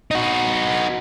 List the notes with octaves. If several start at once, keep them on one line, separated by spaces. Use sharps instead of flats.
D#4 F#4